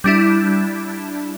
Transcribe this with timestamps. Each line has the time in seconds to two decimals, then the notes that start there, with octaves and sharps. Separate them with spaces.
0.04 G3 D4 E4